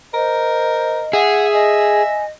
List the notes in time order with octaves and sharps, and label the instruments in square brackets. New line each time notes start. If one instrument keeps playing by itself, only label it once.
[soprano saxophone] A#4 [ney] C5 [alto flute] D#5
[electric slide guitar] G#4 [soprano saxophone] E5 [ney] F#5
[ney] D#5 [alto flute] G#5